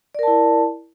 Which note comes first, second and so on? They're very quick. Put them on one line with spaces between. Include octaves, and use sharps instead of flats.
D5 A#4 A5 E4